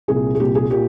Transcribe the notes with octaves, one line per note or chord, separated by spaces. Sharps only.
C2 A#2 G#4
G#4
C2 A#2 G4
G#4
A#2 G4